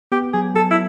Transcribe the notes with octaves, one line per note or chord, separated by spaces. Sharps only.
B3 G4
F#3 G#4
F#3 A4
E4